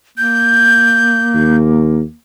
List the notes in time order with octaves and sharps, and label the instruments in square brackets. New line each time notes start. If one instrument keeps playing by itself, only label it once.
[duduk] A#3 [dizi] G6
[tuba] D#2